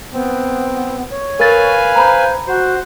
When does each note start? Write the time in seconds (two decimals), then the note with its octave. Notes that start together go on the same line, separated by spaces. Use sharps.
0.13 B3 C4
1.10 C#5
1.40 A#4 B4 F5 G#5 A6
1.96 C5 A#5 B5
2.47 F#4 C5